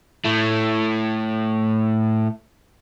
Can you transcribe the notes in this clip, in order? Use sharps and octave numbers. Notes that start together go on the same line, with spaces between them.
A2 A3